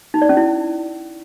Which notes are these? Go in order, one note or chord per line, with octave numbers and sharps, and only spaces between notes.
D#4
D5
C#4
E4